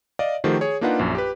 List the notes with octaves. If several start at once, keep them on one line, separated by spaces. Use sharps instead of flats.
D5 D#5 F5
D#3 F3 A3 F#4 G4 C5
G#4 C#5
A#3 D4 D#4 F4 B4 F#5
A#1 F#2
G4 B4